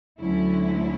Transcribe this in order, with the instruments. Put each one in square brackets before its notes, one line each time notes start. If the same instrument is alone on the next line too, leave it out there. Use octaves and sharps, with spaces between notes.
[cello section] D2 D3 F#3 C#4 E4